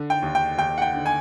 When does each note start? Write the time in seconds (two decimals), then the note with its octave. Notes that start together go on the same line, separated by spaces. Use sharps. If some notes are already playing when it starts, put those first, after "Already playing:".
Already playing: D3
0.10 G5
0.22 D#2
0.35 G5
0.58 D#2 G5
0.78 F#5
0.82 G5
0.94 D3
1.06 G#5